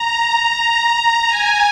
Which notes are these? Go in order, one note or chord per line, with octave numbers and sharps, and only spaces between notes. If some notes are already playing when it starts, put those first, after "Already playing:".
Already playing: A#5
A#5
G#5